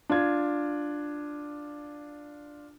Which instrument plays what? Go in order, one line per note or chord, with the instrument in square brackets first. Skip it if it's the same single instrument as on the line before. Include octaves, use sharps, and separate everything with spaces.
[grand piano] D4 F4 G#6